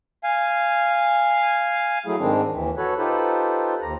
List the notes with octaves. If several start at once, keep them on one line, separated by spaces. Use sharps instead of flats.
F5 G#5
F#3 A3 E4 G#4
G#2 D#3 G#3 C4 D4
D#2 E3
F#4 A4 B4 C#5
D#4 F4 G4 A4 B4 C5
D#2 A#5